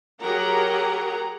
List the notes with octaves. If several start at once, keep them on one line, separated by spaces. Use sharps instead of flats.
F#3 G4 G#4 A#4 F#5 A#5